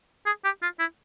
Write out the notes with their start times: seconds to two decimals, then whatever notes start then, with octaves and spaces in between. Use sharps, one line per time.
0.26 G#4
0.44 G4
0.62 F4
0.80 E4